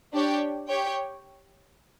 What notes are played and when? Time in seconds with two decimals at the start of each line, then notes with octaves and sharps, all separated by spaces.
0.13 D4 G4 C#5 G5
0.69 G4 C#5 G5